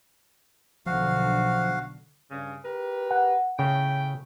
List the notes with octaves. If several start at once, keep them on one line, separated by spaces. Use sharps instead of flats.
B1 D3 F3 F#4 F5
G2 C#3
G4 A#4 B4
F#5
A2 C#3 A3 G5